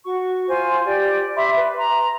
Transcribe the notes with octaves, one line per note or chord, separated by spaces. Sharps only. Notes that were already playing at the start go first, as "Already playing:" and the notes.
F#4 C#6
F4 C5 G#5
G4 D5
E5 B5 C6 D6
B4
A#5 C6